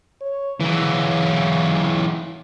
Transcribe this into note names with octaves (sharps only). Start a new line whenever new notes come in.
C#5
C#3 E3 F#3